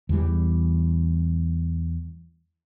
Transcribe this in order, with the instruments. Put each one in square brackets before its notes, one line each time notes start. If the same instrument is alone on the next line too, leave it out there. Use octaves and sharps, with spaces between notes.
[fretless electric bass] E2 E3 F3 G3